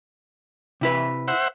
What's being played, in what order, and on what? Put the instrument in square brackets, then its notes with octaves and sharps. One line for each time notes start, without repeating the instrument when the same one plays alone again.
[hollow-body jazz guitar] C3 E4 B4
[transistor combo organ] C5 E5 F#5